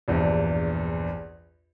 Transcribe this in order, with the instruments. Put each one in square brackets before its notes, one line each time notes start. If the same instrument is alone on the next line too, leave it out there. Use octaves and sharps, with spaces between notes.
[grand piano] A#1 E2 G2